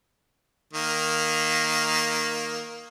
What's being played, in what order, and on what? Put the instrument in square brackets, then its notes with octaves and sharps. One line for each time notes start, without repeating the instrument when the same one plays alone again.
[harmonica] D#3 A#3